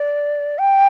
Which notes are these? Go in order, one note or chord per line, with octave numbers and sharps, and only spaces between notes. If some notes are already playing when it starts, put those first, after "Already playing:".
Already playing: D5
G5